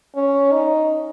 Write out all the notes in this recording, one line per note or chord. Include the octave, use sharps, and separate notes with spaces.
C#4
D#4